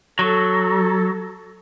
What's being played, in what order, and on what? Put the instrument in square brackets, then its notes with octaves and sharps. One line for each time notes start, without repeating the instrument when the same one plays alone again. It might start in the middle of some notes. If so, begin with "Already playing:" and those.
[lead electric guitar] F#3 [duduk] A4